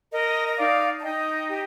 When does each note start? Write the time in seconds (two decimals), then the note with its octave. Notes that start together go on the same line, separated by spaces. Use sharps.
0.12 A#4 D#5
0.48 D#5
0.57 D#4 D5 F5
0.98 A5
1.02 D#4 D#5 G5
1.49 G4